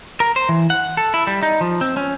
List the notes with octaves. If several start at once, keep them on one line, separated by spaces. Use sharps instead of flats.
A#4
C5
E3
F#5
A4
E4
G3
D#4
F3
C4
C#4